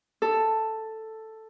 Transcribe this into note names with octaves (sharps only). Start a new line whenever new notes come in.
A4